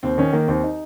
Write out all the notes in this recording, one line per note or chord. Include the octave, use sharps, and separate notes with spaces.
D#2 C4
D#3 C#4
D#3 A#3
D#2 C4
D#4